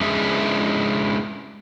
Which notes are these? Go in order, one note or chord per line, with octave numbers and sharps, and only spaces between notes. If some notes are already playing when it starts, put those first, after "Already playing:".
G#3 C#4 D4 E4 G#4 E5